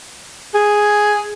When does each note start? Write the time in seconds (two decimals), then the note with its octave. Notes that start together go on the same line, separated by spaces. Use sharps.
0.55 G#4